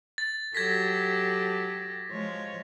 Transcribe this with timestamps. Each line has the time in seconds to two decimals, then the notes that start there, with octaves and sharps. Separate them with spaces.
0.18 A6
0.55 F#3 G4 A4 G#6 A#6 B6
2.11 F3 G#3 C#5